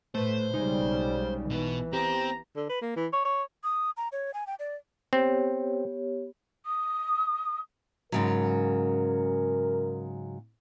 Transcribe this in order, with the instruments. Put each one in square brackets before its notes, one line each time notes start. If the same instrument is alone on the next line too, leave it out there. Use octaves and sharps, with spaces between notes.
[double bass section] A2 [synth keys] A3 B4 [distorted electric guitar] C5
[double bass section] B1 C#3 G3 [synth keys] G#3 D#4
[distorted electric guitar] B2 B3 [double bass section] E3
[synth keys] B3 G4 [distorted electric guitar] C4 [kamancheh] A#5
[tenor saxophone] D3
B4
A#3
E3
C#5
C#5
[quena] D#6
A#5
C#5
G#5
G5
D5
[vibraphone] B3 G4 C#5 [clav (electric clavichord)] C4
[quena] D#6
[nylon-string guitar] G#2 C#3 F#3 [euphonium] A#4